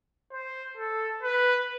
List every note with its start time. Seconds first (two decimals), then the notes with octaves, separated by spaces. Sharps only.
0.31 C5
0.77 A4
1.23 B4